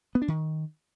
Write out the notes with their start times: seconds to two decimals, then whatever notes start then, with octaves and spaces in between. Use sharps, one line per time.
0.15 B3
0.22 D4
0.28 D#3